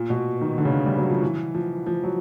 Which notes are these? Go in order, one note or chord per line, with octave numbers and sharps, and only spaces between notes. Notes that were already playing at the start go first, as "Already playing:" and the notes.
Already playing: A#2
B2
D#3
D3
C#3
D3
G3
F#3
F3
E3
F3
F3
F#3